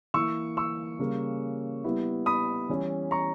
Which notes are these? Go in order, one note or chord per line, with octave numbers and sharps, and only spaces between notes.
E3 A#3 E4 C#6 E6
C#6 E6
C#3 G3 A#3 C#4
G3 B3 E4
B5 D#6
E3 G3 C#4 E4
A#5 C#6